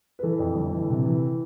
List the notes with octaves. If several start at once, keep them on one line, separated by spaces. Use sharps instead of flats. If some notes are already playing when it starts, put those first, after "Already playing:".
B4
E3 A4
F2
G1
E3
C3
E3